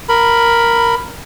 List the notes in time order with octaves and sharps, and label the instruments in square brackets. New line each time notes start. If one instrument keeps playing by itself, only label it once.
[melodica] A#4 B5